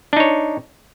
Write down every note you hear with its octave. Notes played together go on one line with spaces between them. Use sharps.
D4 D#4 C#5